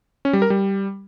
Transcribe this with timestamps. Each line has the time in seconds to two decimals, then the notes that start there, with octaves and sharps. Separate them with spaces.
0.25 C#4
0.33 G3
0.42 A#4
0.50 G3